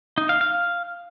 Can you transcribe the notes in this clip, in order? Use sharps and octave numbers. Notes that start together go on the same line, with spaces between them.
D#4
F5
F5